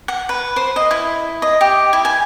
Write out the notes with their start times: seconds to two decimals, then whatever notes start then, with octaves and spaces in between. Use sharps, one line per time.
0.08 F#5
0.29 B4
0.56 C5
0.76 D#5
0.91 E4
1.42 D#5
1.61 G4
1.93 E4
2.05 G#5